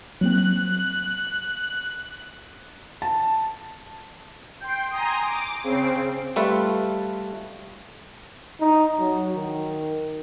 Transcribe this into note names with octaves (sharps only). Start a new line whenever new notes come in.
F#3 A#3 C4 F#6
A5
G5 C6
G#5 A#5 C6 D#6
D6
C#3 C4 C7 D7
G3 A3 F4 A4 B4
D#4
F#3
D#3